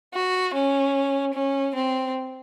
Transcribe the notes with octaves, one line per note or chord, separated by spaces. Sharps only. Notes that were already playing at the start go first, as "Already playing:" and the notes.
F#4
C#4
C#4
C4